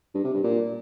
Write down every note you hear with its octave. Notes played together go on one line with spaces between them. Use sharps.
G2
C3
G2
A#2